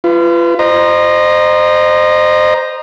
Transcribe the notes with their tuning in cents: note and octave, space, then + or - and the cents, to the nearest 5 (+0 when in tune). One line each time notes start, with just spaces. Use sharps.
F4 -30 B4 +20
C5 -5 D#5 -30 A#5 +10